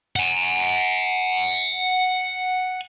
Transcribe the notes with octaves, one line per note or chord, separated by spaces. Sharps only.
F#5 G#5